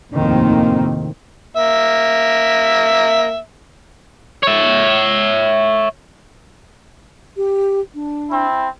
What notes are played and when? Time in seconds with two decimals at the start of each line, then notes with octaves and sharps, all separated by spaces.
0.13 F1 D#2 A2 D#3 A#3 C4
1.57 A#3 E5
4.43 C#5 E5
7.37 G4
7.95 D4
8.31 C4 E4